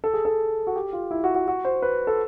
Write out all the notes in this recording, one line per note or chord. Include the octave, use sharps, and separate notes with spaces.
A4
G#4
A4
F#4
G4
F4
E4
F#4
F#4
F#4
C5
B4
A4